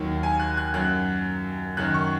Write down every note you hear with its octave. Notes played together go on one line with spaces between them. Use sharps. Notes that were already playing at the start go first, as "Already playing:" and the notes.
Already playing: D#2 D#3 F#3
G#5
F#6
F#6
F#2 F#3 F#6
F#2 D#3 F#3 F#6
C#6